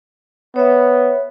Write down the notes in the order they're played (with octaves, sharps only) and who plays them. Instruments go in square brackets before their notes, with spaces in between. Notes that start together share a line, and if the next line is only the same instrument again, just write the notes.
[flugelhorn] B3 [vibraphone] C#5 E5